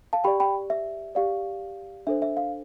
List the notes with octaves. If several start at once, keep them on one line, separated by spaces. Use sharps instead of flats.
F5 A5
G4 D5 G5 B5
G5 B5
E5
G4 D5 F5
D4 A4 C5 E5
E5
F5